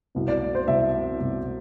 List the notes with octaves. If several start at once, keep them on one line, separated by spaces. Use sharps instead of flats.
C2 B2
D5
C5
C2 B2 E5
C2 B2